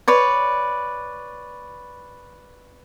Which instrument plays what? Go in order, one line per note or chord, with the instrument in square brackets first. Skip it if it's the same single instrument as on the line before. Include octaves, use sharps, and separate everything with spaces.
[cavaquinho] B4 C#5 D5